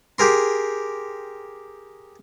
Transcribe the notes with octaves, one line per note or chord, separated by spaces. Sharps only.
G4 G#4 A#4 C6